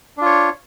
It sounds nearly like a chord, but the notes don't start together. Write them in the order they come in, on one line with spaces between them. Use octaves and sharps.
D4 F4 C#5